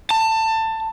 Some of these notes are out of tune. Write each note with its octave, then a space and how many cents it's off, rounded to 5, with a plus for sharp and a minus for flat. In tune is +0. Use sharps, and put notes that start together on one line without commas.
A5 +20